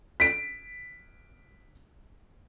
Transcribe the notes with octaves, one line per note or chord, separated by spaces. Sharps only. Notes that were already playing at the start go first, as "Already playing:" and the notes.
B6 D7